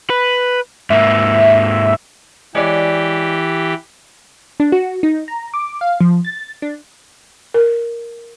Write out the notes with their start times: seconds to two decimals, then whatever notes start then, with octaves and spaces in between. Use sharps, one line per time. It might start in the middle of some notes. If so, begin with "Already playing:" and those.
0.10 B4
0.90 G#2 A#3 E5
2.55 E3 G#3 G4 C#5 D5
4.60 D4
4.72 F#4
5.03 D#4
5.28 A#5
5.54 D6
5.81 F5
6.01 F3
6.25 A6
6.62 D4
7.54 A#4